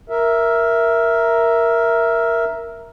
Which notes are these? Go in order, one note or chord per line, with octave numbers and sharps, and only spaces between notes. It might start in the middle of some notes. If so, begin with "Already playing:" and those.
A#4 E5